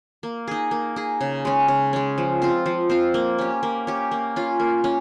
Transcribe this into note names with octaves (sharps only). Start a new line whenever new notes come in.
A#3
D#4 G#4
A#3
D#4 G#4
C#3
G#3 C#4
C#3
G#3 C#4
F3
C4 F4
F3
C4 F4
A#3
C#4 G4
A#3
C#4 G4
A#3
C#4 F4
A#3
C#4